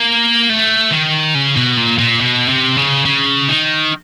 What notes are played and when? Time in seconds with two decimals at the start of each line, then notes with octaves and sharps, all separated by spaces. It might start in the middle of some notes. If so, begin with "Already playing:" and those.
Already playing: A#3
0.49 A3
0.92 D#3
1.35 C#3
1.56 B2
1.77 A#2
1.99 A#2
2.20 B2
2.48 C3
2.77 C#3
3.05 C#3
3.49 D#3